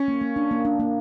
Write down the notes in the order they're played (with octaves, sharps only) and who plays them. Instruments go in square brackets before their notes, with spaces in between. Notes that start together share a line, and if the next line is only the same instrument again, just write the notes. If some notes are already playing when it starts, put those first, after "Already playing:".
Already playing: [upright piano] C#4
[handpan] A#3
A#3
D4
A#3
D4
A#3